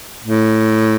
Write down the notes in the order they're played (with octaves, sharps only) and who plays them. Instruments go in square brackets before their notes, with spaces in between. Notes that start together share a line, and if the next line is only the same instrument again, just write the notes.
[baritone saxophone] A2